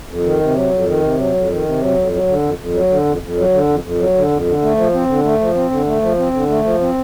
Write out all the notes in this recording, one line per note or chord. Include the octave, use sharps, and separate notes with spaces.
F2
D#3
C3
F#3
F2
D#3
C3
F#3
F2
D#3
C3
F#3
F2
F#3
D3
F2
F2
F#3
D3
F2
F2
F#3
D3
F2
F2
F#3
D3
F2
D3
A3
F3
C4
D3
A3
F3
C4
D3
A3
F3
C4
D3
A3
F3
C4